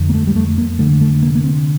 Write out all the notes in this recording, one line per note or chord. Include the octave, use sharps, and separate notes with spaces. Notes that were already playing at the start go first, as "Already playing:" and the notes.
Already playing: F2 D3
A#3
A3
G3
F2 A3
A#3
D3 A3
A3
C3 A#3
A#3
C4